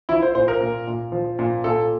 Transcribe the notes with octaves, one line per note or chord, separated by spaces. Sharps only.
F3 E4
C5
A#2 C5
A#4
A#2
A#2
F3
A#2
A#2 A4